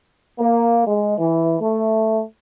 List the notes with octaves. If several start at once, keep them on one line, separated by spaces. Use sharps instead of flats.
A#3
G#3
E3
A3